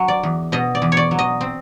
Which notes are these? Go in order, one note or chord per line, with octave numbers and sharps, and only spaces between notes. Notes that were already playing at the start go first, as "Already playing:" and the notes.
Already playing: F#3
D5
E2
B2 D#5
D5
E2
C#5
D5
F#3
D#5
C4